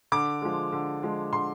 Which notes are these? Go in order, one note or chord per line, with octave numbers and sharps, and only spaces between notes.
D3 D6
F3 G#3
D3
F3 G#3
D3 C6